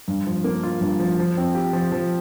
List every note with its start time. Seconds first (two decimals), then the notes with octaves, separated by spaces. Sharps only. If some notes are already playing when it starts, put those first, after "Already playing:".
0.08 G2
0.27 F3
0.44 A#3
0.63 F4
0.81 G2
1.00 F3
1.19 F3
1.37 C4
1.55 G4
1.73 F3
1.92 F3